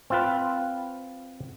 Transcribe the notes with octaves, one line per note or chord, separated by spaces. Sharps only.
C4 F4 B4